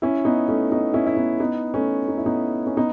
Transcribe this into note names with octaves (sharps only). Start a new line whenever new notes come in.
C#4 E4
B3 D#4
A3 C#4
B3 D#4
C#4 E4
E4
B3 D#4
B3 D#4
A3 C#4
D#4
E4
B3 D#4
C#4
B3 D#4